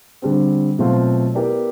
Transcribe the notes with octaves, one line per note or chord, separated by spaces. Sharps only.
D3 G3 C4
B2 F#3 A3 C4 F4
B3 E4 G4 A#4 D5